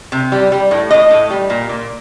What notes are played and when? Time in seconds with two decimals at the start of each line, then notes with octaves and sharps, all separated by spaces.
0.12 C3
0.32 G3
0.52 G3
0.71 A2
0.91 A2 D#5
1.11 A2
1.30 G3
1.50 A#2
1.69 A#2